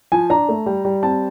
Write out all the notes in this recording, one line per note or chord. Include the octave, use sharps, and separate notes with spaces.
F3 G#5
D4 A#5
A3
G3
G3
C4 A5